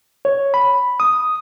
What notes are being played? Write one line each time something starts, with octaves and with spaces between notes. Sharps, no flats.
C#5
B5
D#6